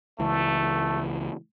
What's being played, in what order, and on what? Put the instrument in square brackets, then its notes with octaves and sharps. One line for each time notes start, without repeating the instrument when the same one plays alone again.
[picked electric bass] C#2 E3 [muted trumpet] A3